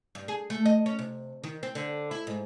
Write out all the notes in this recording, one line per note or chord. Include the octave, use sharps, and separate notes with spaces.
G2
G#4
A3
D#5
C#4
C3
D#3
C4
D3
E4
G#2